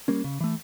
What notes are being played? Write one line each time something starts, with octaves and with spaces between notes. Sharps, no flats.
G3 A#3 C#4
C#3
E3 A3